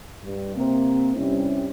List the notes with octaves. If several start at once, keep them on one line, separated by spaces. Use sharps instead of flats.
G2
C3 A#3 C4
G2 C3 G3 C#4 E4